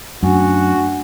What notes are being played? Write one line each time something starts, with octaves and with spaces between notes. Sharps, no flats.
F#2 A3 D4 F#4 G#5